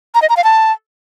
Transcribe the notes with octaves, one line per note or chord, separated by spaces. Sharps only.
A#5
D#5
A#5
F5
A5